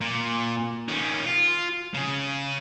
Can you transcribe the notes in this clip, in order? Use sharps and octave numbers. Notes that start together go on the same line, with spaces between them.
A#2
D#3 C#4
F4
C#3 G#4